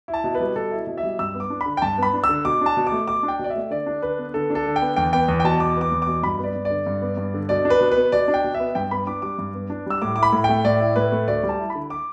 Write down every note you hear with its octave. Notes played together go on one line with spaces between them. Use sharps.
E4
A5
B2
B4
G3
B2 A4
E4
B2
E5
G3
G2 E6
B3
D6
D4
B5
D3
G5
G2 A5
B3 B5
D4
E6
D3
B2 D6
D4 A5
B2
D6
A3
B2 D6
D4
G5
B2
D5
E5
A3
D3 D5
D4
D3 B4
B3
D3 A4
D4
A4
D3
G5
B3
E2 G5
B3 G5
E2
G5
B2 A5
E2 D6
B3 D6
E2
D6
B2
G2 B5
B3 D5
G2
D5
D3
G2
B3
G2
D3
B2 D5
D4
B4
B2
B4
B3
B2 D5
D4
G5
B2
E5
B3
G2 G5
B3 B5
D4 D6
G3 D6
G2
B3
D4
G3 E6
A2 D6
E4 D6
B5
A2
A3 G5
A2 D5
E4
A2 B4
A3
D2 D5
G3
A5
E4
B5
D3
D6